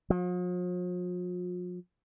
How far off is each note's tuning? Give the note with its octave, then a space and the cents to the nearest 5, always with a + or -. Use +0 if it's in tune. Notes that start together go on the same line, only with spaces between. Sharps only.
F3 +45